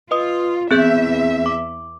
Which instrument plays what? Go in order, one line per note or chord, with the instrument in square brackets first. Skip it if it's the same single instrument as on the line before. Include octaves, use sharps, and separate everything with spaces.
[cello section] F4 [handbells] B4 D#5 D#6
[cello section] E2 E5 [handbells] C4 G#4 G6
[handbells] D6